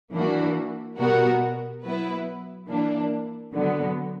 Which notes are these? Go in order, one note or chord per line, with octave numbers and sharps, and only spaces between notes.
E3 A#3 D4 F#4
B2 G3 B3 F#4 A#4
F#3 B3 E4 B4
E3 A#3 D4
D3 F#3 B3